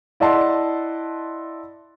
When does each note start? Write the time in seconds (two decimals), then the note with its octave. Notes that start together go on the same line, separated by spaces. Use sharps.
0.20 E4 D5 D#5 F#5 A5 C6